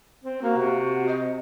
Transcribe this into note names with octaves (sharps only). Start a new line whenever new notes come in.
C4
A#3 F#4
C3
D#5